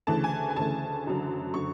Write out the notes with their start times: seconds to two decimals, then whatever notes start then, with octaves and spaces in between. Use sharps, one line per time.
0.07 D2 C#3 E3 A3 A5
0.24 G#5
0.50 G#5
0.56 D2 C#3 E3 A3 A5
1.06 F#1 F#2 D3 F#3
1.54 D3 F#3 C#6